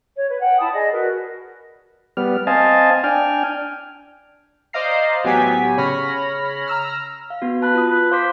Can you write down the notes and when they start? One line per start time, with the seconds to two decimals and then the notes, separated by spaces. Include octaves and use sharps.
0.15 C#5
0.28 B4
0.40 F#5 G5
0.59 E4 A5 B5 D#6
0.72 G#4 D5 D#5
0.91 F#4 A#4 B4
2.17 G3 B3 F6
2.47 C4 D#5 F5 G#5 A5
3.04 D4 G5 G#5 F6
4.73 C5 D5 D#5 F5 A#5 C7
5.24 A1 F#3 B3 G4 G#5 B6
5.77 C#3 C#5 B5 F6 A#6
6.68 A#5 E6 F6
7.30 F5
7.42 B3 F#4
7.62 B4 A5 F#6
7.75 F4 D#6
7.90 B4
8.11 C5 F5 D6 B6